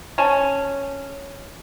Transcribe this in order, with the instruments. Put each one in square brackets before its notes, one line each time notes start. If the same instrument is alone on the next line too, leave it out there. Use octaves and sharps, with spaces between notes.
[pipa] C#4 G#5 A5